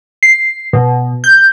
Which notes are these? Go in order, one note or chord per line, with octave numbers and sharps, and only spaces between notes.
C7
B2
G6